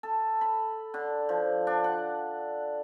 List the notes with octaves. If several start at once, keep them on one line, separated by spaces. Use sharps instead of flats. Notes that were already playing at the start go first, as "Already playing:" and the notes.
A4
B5
D3
F3
D4
F#5